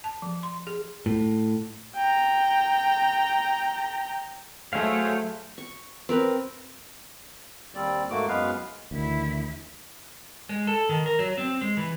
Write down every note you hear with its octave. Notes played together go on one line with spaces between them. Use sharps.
A5
F3
C6
G#4
A2
G5 A#5
F#3 A3 G#4 C5 C#5 F5
C#6
C4 A#4 B4
D#2 G3 C4 D5
G#2 A3 A#3 F#4 D6
F#2 G#3 B3 B4 F5
D2 D#3 E3 E4
G#3
A4
D#3
A#4
F#3
C4
G#3
E3